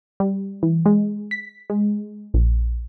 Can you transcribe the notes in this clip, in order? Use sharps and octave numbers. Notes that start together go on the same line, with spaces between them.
G3
E3
G#3
B6
G#3
A#1